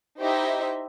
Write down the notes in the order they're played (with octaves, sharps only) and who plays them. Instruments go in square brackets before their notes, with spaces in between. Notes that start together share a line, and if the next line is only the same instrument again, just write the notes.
[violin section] D#4 E4 G4 C5 D#5 E5